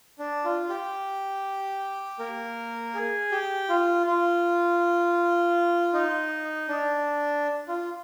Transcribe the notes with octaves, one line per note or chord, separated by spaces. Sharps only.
D4
F4
G4
A#3 A#4
G#4
G4
F4
F4
D#4
D4
F4